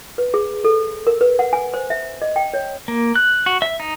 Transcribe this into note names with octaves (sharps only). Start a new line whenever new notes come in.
B4
G#4
A4
A#4
B4
F#5
G#5
C5
E5
D#5
G5
C#5
A#3
F#6
F#4
E5
D#4